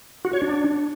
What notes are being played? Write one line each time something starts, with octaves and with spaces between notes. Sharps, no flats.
F#4
C#5
D4